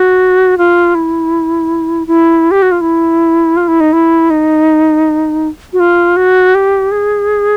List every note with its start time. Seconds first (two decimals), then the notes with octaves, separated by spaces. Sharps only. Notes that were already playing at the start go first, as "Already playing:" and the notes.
Already playing: F#4
0.58 F4
0.95 E4
2.07 E4
2.51 G4
2.62 F#4
2.72 F4
2.81 E4
3.57 F4
3.68 E4
3.80 D#4
3.93 E4
4.30 D#4
5.73 F#4
5.80 F4
6.17 F#4
6.55 G4
6.92 G#4